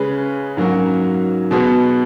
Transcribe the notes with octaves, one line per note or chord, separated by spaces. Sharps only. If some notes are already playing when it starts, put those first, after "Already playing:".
Already playing: C#3 G#3 C#4 G#4 B4
G#2 F#3 A#3 C#4 F#4
B2 G#3 B3 F#4 B4